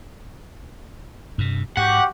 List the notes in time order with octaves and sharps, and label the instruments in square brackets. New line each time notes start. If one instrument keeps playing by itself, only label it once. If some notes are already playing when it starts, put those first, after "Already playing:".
[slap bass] G2 C3
[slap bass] G#2 [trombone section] F#4 G4 [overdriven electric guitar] F#5